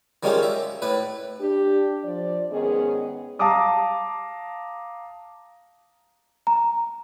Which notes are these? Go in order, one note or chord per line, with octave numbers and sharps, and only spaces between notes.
D#3 G3 G#3 C#4 F4 G4
E5
A2 B4
D4 G4
F3 D5
G#2 D#3 B3 C#4 G#4 D#5
F5 A5 A#5 D6 D#6
A#5